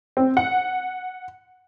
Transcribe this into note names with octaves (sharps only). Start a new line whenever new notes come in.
C4
F#5